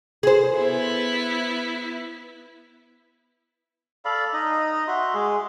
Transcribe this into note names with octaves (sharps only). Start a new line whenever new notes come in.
G#4 C5
B3 E4
A4 D5 F5 B5
D#4 D#5
F#4 E5 C6
G#3 G#4